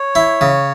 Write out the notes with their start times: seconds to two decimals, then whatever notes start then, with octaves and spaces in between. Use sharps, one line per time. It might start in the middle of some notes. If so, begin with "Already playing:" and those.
Already playing: C#5
0.15 E4
0.41 C#3